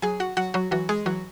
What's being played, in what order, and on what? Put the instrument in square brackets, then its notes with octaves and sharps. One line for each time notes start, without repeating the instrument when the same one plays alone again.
[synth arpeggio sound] F#3 G#4 G#5
F#4 F#5
F#3 F#4 F#5
F#3 F#4
E3 F#3 F#4
G#3 G#4
E3 F#3 F#4